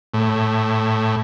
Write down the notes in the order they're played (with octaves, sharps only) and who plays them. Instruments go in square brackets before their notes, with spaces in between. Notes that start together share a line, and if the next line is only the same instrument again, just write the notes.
[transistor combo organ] A2